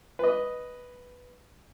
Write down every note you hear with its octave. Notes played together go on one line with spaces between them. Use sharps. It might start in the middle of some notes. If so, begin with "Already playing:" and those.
B4 D#5